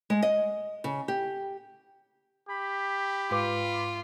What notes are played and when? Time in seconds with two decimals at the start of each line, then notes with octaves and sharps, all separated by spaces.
0.10 G#3
0.22 D#5
0.84 C#3
1.08 G4
2.49 G4 B5
3.31 G#2 F4 B4 D6